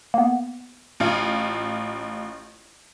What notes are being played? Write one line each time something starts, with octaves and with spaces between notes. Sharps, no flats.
A#3 B3
A1 F4